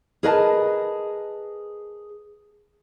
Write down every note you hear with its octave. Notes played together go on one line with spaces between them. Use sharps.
G#4 A#4 B4 D#5 G#5 A5